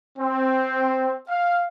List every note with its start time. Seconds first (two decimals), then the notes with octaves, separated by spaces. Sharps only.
0.19 C4
1.30 F5